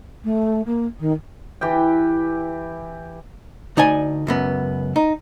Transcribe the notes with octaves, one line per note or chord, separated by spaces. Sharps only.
A3
A#3
D#3
E3 G4 G5
D2 D#4 D5 G#5
C#2 F#2 B3
D#4